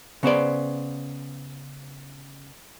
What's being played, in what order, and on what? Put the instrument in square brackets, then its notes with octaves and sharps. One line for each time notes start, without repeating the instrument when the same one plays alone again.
[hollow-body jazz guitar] C#3 B3 C5 D5